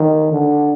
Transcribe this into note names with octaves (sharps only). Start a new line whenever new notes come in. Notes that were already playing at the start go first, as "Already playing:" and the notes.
Already playing: D#3
D3